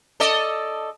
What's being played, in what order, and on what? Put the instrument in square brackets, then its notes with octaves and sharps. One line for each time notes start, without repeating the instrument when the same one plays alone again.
[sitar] A4 D5 D#5